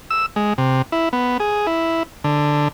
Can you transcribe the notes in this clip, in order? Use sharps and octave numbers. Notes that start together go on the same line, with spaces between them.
E6
G#3
C3
E4
B3
G#4
E4
D3